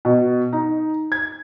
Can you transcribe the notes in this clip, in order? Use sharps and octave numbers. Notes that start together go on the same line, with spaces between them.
B2
D#4
G#6